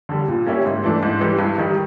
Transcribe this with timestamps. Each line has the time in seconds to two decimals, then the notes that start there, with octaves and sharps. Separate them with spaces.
0.09 D3 G3
0.28 A#2
0.47 G3 A#3 C#4 E4
0.65 G#2
0.83 E3 A3 D4
1.03 G#2
1.21 E3 G3
1.39 G2
1.58 D#3 G3